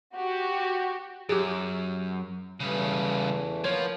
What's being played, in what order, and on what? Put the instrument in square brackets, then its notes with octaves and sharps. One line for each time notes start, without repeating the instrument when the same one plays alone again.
[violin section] F#4 G4
[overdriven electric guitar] F#2 [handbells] G4 G#4
[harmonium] E2 E3 A3 [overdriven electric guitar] C#3 G3
[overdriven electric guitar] F3 [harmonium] A#3 B3 [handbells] C#5 G#6